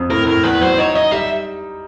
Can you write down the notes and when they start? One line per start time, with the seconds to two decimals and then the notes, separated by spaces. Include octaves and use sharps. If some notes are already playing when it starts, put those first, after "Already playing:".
Already playing: F2
0.10 A2 A#4
0.27 A2 A#4
0.43 E2 B4
0.61 F#3 C5
0.78 D#4 C#5
0.95 D#4 D#5
1.11 G3 E5